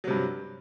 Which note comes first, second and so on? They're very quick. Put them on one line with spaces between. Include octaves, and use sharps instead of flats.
F#3 C3 G2